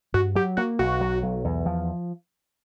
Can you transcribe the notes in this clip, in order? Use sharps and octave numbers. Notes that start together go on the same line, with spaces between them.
G2 F#4
F#3 G4
A#3 F#4
B1 F#4
F#3
B1
E2
F3